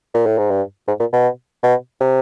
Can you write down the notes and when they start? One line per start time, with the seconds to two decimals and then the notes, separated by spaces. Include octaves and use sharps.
0.14 A#2
0.26 A2
0.38 G#2
0.50 G2
0.88 G#2
1.00 A#2
1.13 B2
1.63 B2
2.00 C3